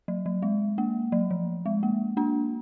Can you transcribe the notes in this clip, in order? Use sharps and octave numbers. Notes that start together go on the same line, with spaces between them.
F#3
F#3
G#3
A#3
F#3
F3
G#3
A#3
A#3 D4